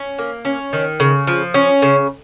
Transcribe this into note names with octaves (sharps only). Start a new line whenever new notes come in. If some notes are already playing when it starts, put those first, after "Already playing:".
Already playing: C#4
A#3
C#4
D#3
C#3
F3
C#4
C#3